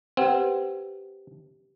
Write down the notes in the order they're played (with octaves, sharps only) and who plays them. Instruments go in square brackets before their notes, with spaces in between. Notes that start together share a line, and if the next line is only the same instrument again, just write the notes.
[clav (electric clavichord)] C4 [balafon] G4 B4 F#5